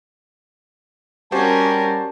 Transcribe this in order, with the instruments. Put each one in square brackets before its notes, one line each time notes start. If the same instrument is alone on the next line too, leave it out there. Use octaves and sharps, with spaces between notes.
[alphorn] G3 [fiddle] C#4 A#4 [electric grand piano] F#4 G4 C5 [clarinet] A5